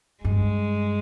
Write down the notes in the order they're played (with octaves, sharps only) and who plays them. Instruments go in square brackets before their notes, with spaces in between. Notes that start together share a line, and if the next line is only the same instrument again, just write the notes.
[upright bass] G2 [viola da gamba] G#3